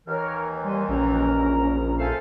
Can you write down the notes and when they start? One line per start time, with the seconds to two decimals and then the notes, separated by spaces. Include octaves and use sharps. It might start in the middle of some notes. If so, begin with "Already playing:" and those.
0.07 D#2 E3 A#4 C#5 F6
0.63 G3 C#5 G#5 C6
0.89 A#1 C#4 A#4 A#5
1.99 A4 C5 E5 F5 G#5